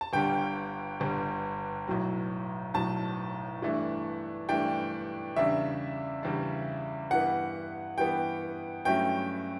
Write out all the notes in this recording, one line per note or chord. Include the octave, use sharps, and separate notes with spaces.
A5
G1 G2 D3 G3 G5
G1 G2 D3 G3
B1 A2 F#3
B1 A2 F#3 A5
G2 E3 A3 D4
G2 E3 A3 D4 G5
E2 C#3 G3 D4 E5
E2 C#3 G3 D4
G2 E3 B3 F#5
G2 E3 B3 G5
G2 F#3 A3 C#4 E4 G5